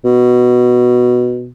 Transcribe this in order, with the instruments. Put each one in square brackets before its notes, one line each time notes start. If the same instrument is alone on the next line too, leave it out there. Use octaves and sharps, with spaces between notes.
[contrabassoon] B2